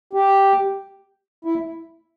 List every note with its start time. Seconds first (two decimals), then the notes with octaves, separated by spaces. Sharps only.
0.13 G4
1.45 E4